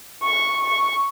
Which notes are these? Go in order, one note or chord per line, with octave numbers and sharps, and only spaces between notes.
C#6
C#6